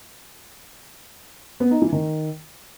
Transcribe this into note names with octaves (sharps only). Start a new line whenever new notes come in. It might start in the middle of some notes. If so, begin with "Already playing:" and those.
B3
D#4
E3
D#3